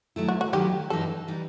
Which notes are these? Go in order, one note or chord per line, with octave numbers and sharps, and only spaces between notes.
D#3 F#3 A3 E4
F#4
F#4
D#3 F#3 A3 E4 G4
G2 E3 G3 D#4 A4
E3 G3 D#4